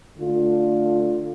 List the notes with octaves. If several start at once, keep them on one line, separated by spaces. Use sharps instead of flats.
D3 A3 F4